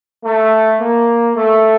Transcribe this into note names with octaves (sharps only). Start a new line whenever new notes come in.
A3
A#3
A3